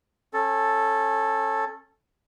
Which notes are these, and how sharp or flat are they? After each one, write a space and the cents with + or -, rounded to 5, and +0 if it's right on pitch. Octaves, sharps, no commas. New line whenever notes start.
C#4 -20 A4 +0